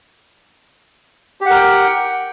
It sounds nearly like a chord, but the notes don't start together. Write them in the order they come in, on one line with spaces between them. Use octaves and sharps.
G4 F#5 A#4 G5